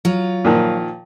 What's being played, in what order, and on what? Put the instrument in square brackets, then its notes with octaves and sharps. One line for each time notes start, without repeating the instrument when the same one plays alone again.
[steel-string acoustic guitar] F#3 F4
[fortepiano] A#2 D#3 F3